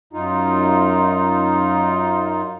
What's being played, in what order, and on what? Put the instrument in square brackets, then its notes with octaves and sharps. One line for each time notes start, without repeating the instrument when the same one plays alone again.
[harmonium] F#2 D#4 F4